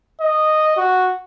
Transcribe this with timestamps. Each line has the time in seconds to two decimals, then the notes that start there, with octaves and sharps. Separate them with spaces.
0.21 D#5
0.77 F#4